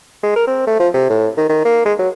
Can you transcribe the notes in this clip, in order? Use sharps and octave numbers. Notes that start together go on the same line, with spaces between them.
G#3
A#4
C4
A3
F3
C3
A2
D#3
D#3
A#3
G#3
F#3